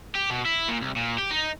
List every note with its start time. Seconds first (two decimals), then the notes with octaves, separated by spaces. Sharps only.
0.15 G4
0.30 B2
0.45 E4
0.68 A#2
0.81 C2
0.96 A#2
1.18 G4
1.31 D#4